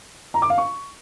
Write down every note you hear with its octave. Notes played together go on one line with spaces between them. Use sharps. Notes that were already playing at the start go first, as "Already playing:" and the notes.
A#5
D6
F5
C#6